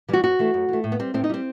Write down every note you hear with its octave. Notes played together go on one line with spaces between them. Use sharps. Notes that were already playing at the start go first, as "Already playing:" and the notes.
E3 G3 F#4
F#2 F#4
E3 A3
F#2
E3 A3
A2
B3
G3 C4
A2 C4
D#4
G3 C4